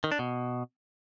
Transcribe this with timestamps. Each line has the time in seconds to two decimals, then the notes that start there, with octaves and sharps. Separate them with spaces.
0.04 D#3
0.12 D4
0.19 B2